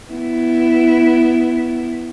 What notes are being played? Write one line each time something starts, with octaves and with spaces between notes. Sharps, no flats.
B3 E4